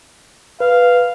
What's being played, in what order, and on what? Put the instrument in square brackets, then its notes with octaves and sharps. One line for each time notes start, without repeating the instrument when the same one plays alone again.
[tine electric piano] B4 [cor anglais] F5